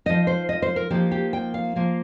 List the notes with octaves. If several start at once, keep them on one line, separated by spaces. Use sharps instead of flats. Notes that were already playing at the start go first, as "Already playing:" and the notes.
F3 D#4 D#5
C5
D#5
C5
A#4
F3 A#3 D#4 G4
G4
G5
F5
F3 A#3 F4